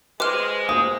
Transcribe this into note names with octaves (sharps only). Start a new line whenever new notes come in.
G#3 B4 C5 D6 F6
A#3 C5 D#6